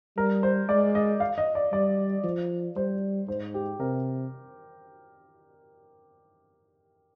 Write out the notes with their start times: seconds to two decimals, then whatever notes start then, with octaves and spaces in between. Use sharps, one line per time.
0.17 G3 A#4
0.43 C5
0.69 G#3 D5
0.95 D#5
1.20 F5
1.38 D#5
1.55 D5
1.72 G3 D5
2.24 F3
2.76 G3 C5
3.28 G#2 C5
3.54 G4
3.80 C3 A#4